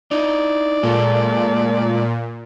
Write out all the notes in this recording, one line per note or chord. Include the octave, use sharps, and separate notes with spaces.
D#4 E4 D5 D#5
A#2 G#3 A3 A4